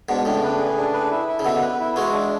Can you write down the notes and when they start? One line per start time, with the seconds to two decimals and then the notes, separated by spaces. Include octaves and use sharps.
0.09 G#2 B2 D4
0.25 A2 C#3 D4
0.43 B4
0.60 G#4
0.78 D4
0.94 B4
1.11 E4
1.28 E4
1.39 C#3
1.45 B2 D3 E5
1.62 B4
1.80 E4
1.96 E3 G#3 F#4
2.13 D4